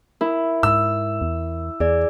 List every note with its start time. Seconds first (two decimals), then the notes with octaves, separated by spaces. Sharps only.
0.21 E4 A#4
0.63 G#2 E6
1.22 E2
1.80 E2 G#4 D5